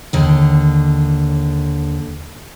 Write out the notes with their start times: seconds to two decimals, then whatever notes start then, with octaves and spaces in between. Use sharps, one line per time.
0.13 D#2 D3